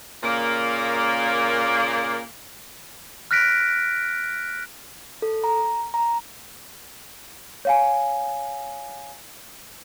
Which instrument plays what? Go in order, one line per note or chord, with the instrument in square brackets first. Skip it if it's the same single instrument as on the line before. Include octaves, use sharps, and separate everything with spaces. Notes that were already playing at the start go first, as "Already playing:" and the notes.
[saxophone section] A#2 C#3 A#3
[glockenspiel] F6 F#6 A#6 B6 D7
[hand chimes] A4
A#5
A#5
[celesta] C#5 F5 G#5